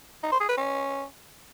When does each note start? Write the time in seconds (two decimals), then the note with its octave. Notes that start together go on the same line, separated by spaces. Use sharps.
0.23 D#4
0.32 C5
0.40 G#4
0.49 B4
0.57 C#4